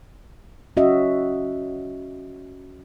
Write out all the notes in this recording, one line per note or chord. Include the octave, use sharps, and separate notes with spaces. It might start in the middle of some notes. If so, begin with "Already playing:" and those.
C#4 F#4 D#5 E5